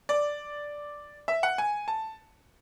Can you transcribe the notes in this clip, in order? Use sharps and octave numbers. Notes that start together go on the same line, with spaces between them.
D5
E5
F#5
G#5
A5